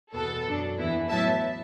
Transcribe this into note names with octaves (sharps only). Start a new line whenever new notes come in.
E2 B2 B3 A4
F#2 F#3 D4
E2 E3 B3 E4
A2 F#3 B3 E4 E5 A5